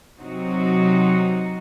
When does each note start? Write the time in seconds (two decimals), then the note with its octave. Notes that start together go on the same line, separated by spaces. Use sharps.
0.19 C3 F#3 C4 D#4 F#4